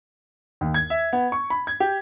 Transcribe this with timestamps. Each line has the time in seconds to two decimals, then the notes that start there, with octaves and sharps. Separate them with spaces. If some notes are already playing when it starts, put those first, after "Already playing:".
0.61 D#2
0.74 G#6
0.90 E5
1.13 B3
1.32 C#6
1.50 B5
1.67 G#6
1.80 G4